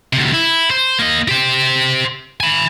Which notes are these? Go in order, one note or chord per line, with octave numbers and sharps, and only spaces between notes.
D2 C3
E4
C5
A#3 D#5
G4 C5
G#5 B5